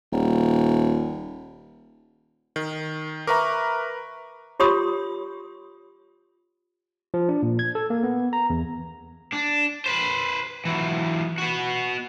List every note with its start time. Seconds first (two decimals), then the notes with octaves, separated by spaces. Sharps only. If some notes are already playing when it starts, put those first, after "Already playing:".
0.12 D#1
2.56 D#3
3.27 A#4 B4 E5 A#5 C#6 D6
4.60 F4 G4 C#5 B5 C6 D#6
7.14 F3
7.29 D4
7.43 A#2
7.59 G#6
7.75 A4
7.90 A#3
8.03 B3
8.33 A#5
8.50 E2
9.33 D4
9.86 B4 C5
10.65 E3 F#3
11.38 B3 F#4